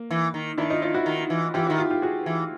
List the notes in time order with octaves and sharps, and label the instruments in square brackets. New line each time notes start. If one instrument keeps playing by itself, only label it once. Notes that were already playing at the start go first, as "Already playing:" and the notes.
Already playing: [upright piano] A#3
[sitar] E3
D#3
[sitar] D#3 [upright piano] D4 E4
[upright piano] D#4 F4
D#4 F4
E4 F#4
[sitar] D#3
E3
[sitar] E3 [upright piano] F4 G4
[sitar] D#3 [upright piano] E4 F#4
[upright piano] F4 G4
F4 G4
F#4 G#4
[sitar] E3